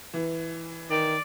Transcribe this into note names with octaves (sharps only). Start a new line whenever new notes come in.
E3
D#3 D5